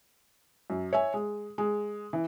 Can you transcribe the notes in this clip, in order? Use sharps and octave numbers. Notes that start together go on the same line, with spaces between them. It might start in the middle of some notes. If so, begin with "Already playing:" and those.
F#2
C#5 E5 G#5
G#3
G#3
E3